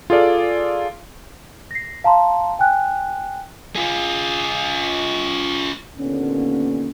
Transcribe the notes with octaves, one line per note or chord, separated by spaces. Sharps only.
F4 G#4 A4 D5 F5
A#6 C7
F5 A5 A#5 C6
G5 G#5 F#6
F4 G#4
D#2 A#2 D3 B3 C#4